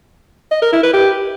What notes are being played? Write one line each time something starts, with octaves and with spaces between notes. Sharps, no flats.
D#5
A#4
E4
B4
G4